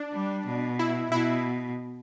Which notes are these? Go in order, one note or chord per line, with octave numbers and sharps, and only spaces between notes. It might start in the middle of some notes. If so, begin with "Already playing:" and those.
Already playing: D4
G3
B2
E4
B2 E4